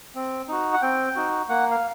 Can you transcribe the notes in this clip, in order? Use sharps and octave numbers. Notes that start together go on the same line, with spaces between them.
C4
D#4 F#4
F#5
C4 G5
D#4 F#4
A#3 F#5
F5